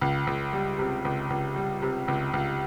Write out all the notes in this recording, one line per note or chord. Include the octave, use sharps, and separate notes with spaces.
C#2
C#2
G3
C3
C#2
C#2
G3
C3
C#2
C#2